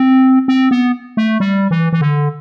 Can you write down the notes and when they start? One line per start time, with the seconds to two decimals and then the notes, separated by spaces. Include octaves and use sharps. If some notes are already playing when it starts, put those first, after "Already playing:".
Already playing: C4
0.48 C4
0.71 B3
1.17 A3
1.40 G3
1.71 E3
1.93 E3
2.01 D3